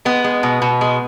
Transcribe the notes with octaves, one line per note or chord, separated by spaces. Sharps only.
G#3 B3
G#3
B2
B2
G#3